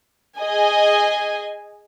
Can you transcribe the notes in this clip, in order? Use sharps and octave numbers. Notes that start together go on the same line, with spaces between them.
G#4 D#5 G#5